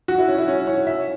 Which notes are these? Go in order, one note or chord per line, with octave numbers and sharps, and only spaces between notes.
F#4
E4
C#4
E4
C#4
C#5
E5